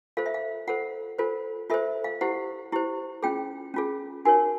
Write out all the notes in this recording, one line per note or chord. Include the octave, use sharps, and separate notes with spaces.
F4 A4 C5 F5
E5
F5
F4 A4 C5 F#5
F4 A4 C5
F4 A4 C5 E5
F5
E4 G4 C5 F#5
E4 G4 C5
C#4 F4 G#4 G5
C#4 F4 G#4
D#4 F#4 A#4 C#5 G#5